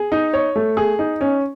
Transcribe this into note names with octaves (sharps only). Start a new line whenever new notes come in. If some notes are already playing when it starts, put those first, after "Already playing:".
Already playing: G#4
D#4
C#5
A3
G#4
D#4
C#4